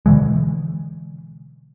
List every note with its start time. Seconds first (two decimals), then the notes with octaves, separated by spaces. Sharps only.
0.06 B2 D3 E3 G#3